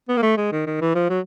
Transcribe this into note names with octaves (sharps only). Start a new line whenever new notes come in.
B3
A#3
A3
G#3
D#3
D#3
E3
F3
F#3